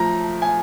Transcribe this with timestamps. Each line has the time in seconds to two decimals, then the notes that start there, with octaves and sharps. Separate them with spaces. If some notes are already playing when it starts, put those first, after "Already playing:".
Already playing: F3 A3 A#5
0.42 G#5